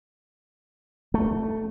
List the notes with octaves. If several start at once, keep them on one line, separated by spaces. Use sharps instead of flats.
A3